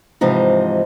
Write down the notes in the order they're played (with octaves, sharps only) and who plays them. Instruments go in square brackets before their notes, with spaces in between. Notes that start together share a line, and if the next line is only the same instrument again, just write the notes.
[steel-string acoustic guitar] G#2 C3 E3 F3 D#4